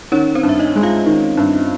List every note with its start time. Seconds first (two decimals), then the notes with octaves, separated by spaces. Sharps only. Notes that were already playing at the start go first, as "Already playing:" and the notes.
0.12 D#3 C#4 C#5
0.35 C4 C5
0.43 G2
0.49 E5
0.59 D#4 D#5
0.76 G#3
0.83 F4 F5
1.06 D#3
1.37 G2